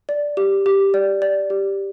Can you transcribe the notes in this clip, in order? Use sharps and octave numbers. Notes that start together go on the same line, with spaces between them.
D5
G4
G4
D5
D5
G4